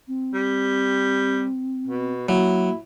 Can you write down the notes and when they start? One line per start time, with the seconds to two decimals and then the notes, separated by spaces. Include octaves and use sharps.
0.08 C4
0.34 G3
1.87 B2
2.29 F#3 A#3 E4